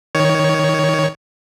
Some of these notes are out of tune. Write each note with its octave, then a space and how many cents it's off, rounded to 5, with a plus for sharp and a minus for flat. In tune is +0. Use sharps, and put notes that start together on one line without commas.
D#3 +15 C#5 +10